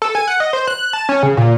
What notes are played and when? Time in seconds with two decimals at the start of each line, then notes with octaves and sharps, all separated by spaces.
0.02 A4
0.15 G#5
0.28 F#5
0.40 D#5
0.53 C5
0.68 F#6
0.93 A5
1.09 C#4
1.23 C#3
1.37 A#2